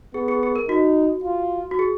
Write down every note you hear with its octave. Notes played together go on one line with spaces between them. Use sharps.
B3 G#4
G#4
G#4
A#4
D#4 F#4
F4
F#4
G#4